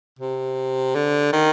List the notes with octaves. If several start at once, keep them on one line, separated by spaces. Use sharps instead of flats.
C3
D3
D#3